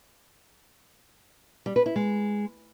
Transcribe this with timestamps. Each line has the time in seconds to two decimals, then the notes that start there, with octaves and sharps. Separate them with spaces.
1.66 G3
1.76 B4
1.86 E4
1.96 G#3